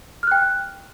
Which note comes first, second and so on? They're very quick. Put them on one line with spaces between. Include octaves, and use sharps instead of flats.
F6 F#6 G5